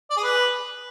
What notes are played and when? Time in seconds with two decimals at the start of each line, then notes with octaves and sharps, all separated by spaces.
0.10 D5
0.17 G#4
0.24 B4